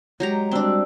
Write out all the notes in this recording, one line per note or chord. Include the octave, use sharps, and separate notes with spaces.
F#3 G#3 G4 A#5
G3 C4 D4 F#4 E6